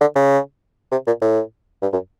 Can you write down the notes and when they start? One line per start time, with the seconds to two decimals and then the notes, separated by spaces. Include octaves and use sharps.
0.01 D3
0.15 C#3
0.92 C3
1.07 A#2
1.22 A2
1.82 G2
1.93 F#2